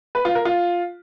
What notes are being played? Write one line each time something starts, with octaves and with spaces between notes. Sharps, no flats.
B4
F4
A#4
F4